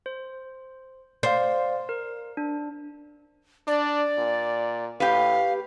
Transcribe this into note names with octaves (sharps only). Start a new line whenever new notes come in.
C5
C5 D5 F5
A#4
D4
D4 D5
A#2
A2 G4 B4 F5